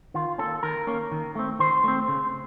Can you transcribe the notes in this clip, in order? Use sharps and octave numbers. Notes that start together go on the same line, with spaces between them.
D#3 F4
A#3 C#4 A4
D#3 A#4
A#3 C#4
D#3
A3 C4
D#3 C5
A3 C4
C#3